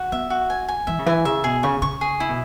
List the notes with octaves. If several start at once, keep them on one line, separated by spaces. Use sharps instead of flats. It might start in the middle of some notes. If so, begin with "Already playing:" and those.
Already playing: F#4
B3 E5
F#4
G#5
G#5
E3 E5
C#3
E3 G#5
C#3 E5
B2 G#4
C#3 C#6
C#3 C#6
G#4
E4
B2